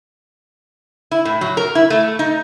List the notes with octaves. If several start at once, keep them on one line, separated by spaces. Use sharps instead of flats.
E4
A2
F#3
A#4
E4
A3
D#4